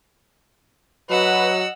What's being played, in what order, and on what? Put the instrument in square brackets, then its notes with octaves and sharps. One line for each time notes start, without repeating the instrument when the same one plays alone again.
[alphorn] F#3 [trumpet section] F#4 B4 [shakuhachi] D#5 [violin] F#5 E6